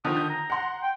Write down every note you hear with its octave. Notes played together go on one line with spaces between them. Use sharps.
D3 D#3 F3 D#6
G6
A#5
F#5 C6
G5